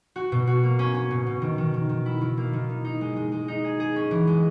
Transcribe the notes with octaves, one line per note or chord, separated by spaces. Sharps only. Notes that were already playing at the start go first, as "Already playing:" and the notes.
F#4
B2
F#4
A#3
C#4
C#4
B2
B2
D#3
D#3
D#3
D#3
E4
D#3
A#3
D#3
D#4
D#4
G#3
G#3
G#3
D#4
G#4
G#4
C#4
E3
G#3